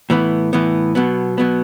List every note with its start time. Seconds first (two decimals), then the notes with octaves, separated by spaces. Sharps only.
0.10 A2 E3 B3
0.53 A2 E3 B3
0.95 B2 F#3 B3
1.38 B2 F#3 B3